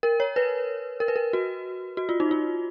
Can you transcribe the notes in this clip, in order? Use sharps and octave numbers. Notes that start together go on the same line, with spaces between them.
A#4
C#5
B4
A#4
B4
A#4
F#4
F#4
F4
D#4
F4